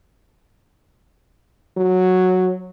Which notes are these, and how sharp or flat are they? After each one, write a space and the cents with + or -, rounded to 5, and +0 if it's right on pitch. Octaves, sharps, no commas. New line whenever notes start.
F#3 -5